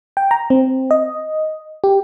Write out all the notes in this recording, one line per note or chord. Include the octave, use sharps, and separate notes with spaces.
G5
A#5
C4
D#5
G4